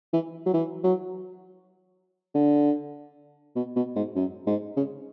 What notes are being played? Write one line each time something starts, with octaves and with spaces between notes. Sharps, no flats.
E3
F#3
E3
F#3
D3
B2
B2
G#2
F#2
G#2
C#3